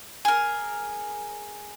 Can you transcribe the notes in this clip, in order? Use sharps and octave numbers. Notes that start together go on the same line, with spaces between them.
G#4 A#4